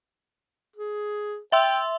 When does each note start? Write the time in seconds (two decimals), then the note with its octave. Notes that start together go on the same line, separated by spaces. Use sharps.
0.76 G#4
1.52 E5 G5 C6 E6